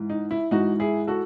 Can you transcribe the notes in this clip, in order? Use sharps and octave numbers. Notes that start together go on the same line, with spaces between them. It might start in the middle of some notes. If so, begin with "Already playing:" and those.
Already playing: G#2 E3
D#4
E4
G#2 E3 D#4 F#4
E4 G#4
F#4 A4